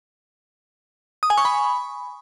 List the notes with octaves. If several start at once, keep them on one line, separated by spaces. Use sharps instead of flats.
D#6
G#5
C#6
B5